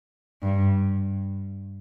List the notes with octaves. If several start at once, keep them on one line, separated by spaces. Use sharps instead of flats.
G2